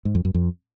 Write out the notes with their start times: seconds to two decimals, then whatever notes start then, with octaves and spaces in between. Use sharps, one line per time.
0.05 G#2
0.15 F2
0.25 F#2
0.34 F2